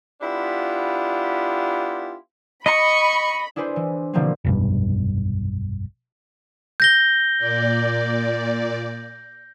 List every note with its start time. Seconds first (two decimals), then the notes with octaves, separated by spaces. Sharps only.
0.21 B3 D4 E4 F4 G4
2.66 D#5 B5 C#6
3.56 D4 E4 G#4 B4 C5
3.76 E3
4.13 B2 D3 E3 F3 A#3 C4
4.45 F1 B1 G2
6.80 G6 A#6 G7
7.38 A#2 D5